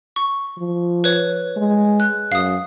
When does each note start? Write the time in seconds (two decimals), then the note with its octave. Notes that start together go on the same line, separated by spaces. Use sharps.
0.16 C#6
0.58 F3
1.04 B4 C#5
1.57 G#3
2.00 F#6
2.32 F#2 F5 D#6